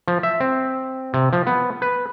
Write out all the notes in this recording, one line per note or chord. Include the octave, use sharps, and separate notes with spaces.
F3
E5
C4
C3
F3
B3
B4